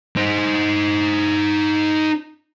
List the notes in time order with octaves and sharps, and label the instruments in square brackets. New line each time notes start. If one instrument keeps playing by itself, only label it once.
[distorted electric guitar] D#4 C5